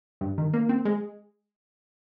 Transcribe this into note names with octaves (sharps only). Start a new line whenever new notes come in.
G2
D#3
A#3
C4
G#3